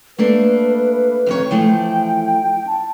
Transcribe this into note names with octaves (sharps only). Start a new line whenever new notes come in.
A3 A#3 D4 B4
F2 D#3 C#5
E3 F3 A3 G5
A5